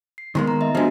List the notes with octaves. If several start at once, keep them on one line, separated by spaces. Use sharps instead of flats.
C7
D#3 G#3 A#3 B3 C6
A#5
D#5 E5
F3 G#3 B3 D4 F#4